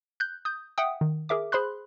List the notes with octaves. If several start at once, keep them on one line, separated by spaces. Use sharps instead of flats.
F#6 G6
D#6 G6
E5 F#5 G5 D#6
D#3
G#4 A#4 E5 D6
G#4 C5 B5 C6 F#6